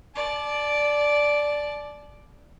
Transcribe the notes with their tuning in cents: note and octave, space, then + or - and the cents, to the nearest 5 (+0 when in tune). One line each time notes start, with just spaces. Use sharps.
D5 +0 A5 -35